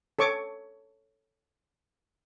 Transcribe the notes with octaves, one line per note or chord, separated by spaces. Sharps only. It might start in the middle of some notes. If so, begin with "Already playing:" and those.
A4 C#5 C#6 D6